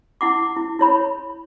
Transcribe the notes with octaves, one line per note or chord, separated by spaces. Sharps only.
E4 F#5 D6
E4
E4 C#5 B5